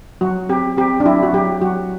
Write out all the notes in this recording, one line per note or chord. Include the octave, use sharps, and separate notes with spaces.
F#3 F#4
C4 G4
C4 G4
D4
F#3 E4
F#4
F#3 G4
F#3 F#4